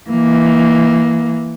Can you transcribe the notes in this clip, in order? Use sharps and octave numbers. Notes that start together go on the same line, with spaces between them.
E3 A#3